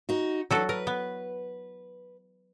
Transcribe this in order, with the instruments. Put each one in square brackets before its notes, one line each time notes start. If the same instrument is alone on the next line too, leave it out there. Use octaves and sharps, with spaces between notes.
[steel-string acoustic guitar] D#4 F#4
[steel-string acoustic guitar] E3 D4 [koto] F#3 F#4 A4
[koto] A#4 [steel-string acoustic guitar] B4
[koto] B3